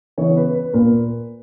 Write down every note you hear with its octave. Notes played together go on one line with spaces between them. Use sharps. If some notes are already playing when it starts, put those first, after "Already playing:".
C#3 E3 B3 C#5
B4
B4
A#2 A#3